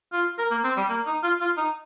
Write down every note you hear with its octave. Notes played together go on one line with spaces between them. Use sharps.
F4
A#4
A#3
C4
G3
A#3
D#4
F4
F4
D#4